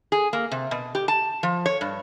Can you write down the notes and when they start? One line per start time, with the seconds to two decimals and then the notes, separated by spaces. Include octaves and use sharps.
0.12 G#4
0.33 A#3
0.52 C3
0.71 B2
0.95 G4
1.08 A5
1.43 F3
1.66 C#5
1.81 G2